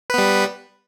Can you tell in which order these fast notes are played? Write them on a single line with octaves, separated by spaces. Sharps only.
B4 B3 G3